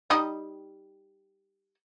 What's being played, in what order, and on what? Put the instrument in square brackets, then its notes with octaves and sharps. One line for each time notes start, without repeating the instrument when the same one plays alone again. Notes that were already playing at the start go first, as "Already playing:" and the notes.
[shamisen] G3 D#4 D#5